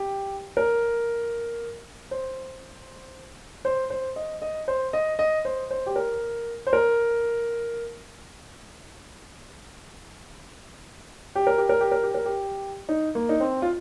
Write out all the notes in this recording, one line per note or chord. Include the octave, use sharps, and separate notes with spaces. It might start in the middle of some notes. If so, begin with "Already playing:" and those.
Already playing: G4
A#4
C5
C5
C5
D#5
D#5
C5
D#5
D#5
C5
C5
G4
A#4
C5
A#4
G4
A#4
G4
A#4
G4
A#4
G4
A#4
G4
D#4
A#3
D#4
C4
F4